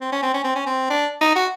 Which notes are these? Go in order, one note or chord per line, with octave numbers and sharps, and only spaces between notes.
C4
C#4
C4
C#4
C4
C#4
C4
D4
D#4
F#4